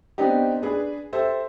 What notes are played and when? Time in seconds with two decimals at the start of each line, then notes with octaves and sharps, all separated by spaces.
0.18 B3 C4 D4 D#4 G4
0.62 D4 G#4 B4
1.13 G4 A4 C5 E5